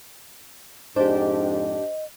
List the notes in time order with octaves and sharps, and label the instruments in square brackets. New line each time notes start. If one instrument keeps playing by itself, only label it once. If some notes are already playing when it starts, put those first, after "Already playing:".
[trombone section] F2 G#2 [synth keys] D4 G4 [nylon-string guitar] C5 [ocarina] D#5